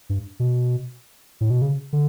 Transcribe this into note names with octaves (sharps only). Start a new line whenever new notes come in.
G2
B2
A2
B2
C#3
D3